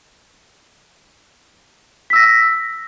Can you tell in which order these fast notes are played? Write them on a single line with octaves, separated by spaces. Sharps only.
B6 E6 A#6